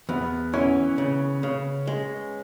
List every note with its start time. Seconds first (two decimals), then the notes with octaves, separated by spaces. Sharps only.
0.09 E2 B3 B4
0.53 E3 C#4 C#5
0.98 C#3
1.43 C#3
1.87 G#3